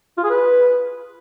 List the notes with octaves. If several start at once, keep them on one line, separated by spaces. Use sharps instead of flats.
F4
G#4
B4